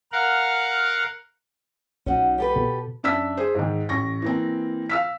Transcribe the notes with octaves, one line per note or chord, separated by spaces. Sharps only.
A#4 F5 F#5
B1 C#4 D#4 F#4
G4 A4 B4
B2
F#2 D4 E5 E6 B6
G#4 C5
G#2 D#3
A1 C#6 A#6
E3 A#3 C4
F5 E6 B6